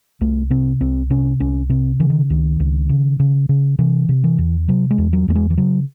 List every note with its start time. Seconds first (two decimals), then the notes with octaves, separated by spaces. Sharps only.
0.21 C2 A3
0.50 C3 C4
0.81 C2 C4
1.10 C3 C#4
1.40 C2 C#4
1.69 C3 C4
2.00 C#3 E3
2.10 D#3
2.30 C#2 D#3
2.60 C#2
2.89 C#3
3.20 C#3
3.49 C#3
3.79 C3 E3
4.09 C3
4.24 E3
4.38 E2
4.68 C3 F#3
4.90 G#3
4.98 E2
5.13 F#3
5.28 E2 A3
5.35 G#3
5.50 E3
5.57 C#3 F#3